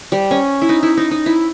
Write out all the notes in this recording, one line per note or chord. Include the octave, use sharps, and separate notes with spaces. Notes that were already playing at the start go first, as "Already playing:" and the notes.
G3
C#4
E4
D#4
E4
D#4
D#4
E4